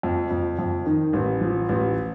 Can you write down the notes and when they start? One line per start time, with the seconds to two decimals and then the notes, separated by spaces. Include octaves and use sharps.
0.03 F2
0.31 F2
0.59 F2
0.86 D#3
1.13 A1
1.41 F3
1.69 A1